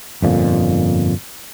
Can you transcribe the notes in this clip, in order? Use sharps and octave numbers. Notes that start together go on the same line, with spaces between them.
G1 F2 A#2